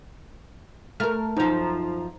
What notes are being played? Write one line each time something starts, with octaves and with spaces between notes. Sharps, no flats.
A3 A#4 A#5 F6
F#2 F3 D#4 C5 A#5